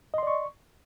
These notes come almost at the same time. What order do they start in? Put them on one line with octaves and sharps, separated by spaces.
D#5 C6 D5 C#6